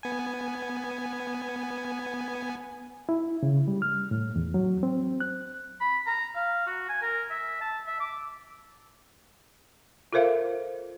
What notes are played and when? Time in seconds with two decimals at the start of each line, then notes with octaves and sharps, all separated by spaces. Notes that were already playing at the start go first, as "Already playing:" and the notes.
0.03 B3 G#5
3.09 E4
3.43 C#3
3.68 G3
3.82 F6
4.11 A2
4.36 E2
4.54 F#3
4.83 C4
5.20 F#6
5.80 B5
6.07 A#5
6.35 F5
6.67 F#4
6.89 G#5
7.02 A#4
7.30 E5
7.61 A5
7.86 E5
8.00 D6
10.13 F4 A4 A#4 C5 E5 F5